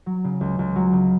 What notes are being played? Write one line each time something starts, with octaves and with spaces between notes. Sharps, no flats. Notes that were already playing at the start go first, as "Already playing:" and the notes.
F#3
C#3
C#2
C#2
F#3
C#3